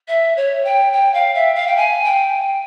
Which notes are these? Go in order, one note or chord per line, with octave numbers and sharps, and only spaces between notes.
E5
C#5
G5
G5
F5
E5
F5
G5
G#5
G5